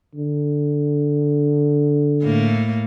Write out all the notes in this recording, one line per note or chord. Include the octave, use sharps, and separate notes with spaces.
D3
A2 A3 A#3